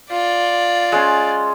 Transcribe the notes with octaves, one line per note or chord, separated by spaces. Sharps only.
F4 D5
G#3 C#4